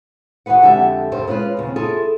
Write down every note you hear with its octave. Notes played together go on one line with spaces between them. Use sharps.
E3 F#4 G#4 B4 F#5
F2 D3 G#3 G4 E5
D2 G2 D3 G3 C5
G#3 C#4 F4 A#4 B4
D#2 C#3 C4
E4 F4 G#4 A4